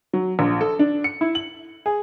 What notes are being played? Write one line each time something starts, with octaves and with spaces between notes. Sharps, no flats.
F#3
A#1
A4
D4
C#7
E4
F#7
G#4